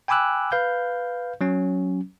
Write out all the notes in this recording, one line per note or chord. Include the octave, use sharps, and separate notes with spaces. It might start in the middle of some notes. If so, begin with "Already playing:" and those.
G5 G#5 B5 D6 E6 F#6
B4 F5 G6
F#3 C#4